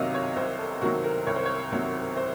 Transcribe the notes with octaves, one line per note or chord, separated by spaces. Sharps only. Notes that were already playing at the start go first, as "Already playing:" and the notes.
Already playing: C2 C3 D#3 F#3 A#4 D#5 F5
C#5
C2 C5
A4
C3 D#3 F#3 F#4
A#4
C2 C#5
C5
C#5
C3 D#3 F#3
C5